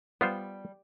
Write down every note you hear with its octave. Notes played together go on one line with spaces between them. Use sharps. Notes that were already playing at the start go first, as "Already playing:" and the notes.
G3 B3 F4 C5